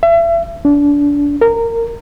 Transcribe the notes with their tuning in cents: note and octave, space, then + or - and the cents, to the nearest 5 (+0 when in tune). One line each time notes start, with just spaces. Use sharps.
E5 +35
D4 -30
A#4 -20